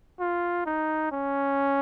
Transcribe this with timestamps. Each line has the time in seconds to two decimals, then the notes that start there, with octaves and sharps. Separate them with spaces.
0.20 F4
0.66 D#4
1.12 C#4